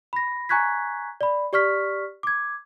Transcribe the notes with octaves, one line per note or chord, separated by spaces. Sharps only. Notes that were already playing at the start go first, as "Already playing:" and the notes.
B5 A#6
G#5 A#5 C#6 F#6 G#6 B6
D5 B5
G4 D5 C#6 F6 B6
D6 G#6